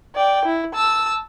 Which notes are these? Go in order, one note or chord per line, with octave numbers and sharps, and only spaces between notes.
D5 G5
E4
A5 E6